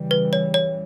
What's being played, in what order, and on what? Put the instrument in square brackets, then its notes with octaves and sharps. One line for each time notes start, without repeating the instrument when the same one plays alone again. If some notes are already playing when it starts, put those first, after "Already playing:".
Already playing: [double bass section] C#3 E3 G3
[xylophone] B4
C#5
C#5